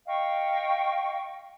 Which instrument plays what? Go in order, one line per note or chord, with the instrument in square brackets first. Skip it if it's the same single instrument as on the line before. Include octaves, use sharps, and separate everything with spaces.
[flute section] D#5 F5 G5 C#6